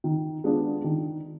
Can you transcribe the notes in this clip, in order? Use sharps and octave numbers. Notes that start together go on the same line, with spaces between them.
D#3
G#3 B3 D4 F4
D#3